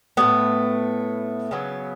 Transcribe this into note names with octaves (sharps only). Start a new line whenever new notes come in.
A2 F#3 A3 B3
C#3 F#3 B3